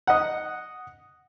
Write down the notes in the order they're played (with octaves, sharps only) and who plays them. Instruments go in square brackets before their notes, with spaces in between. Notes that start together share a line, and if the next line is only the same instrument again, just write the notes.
[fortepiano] D#5 F#5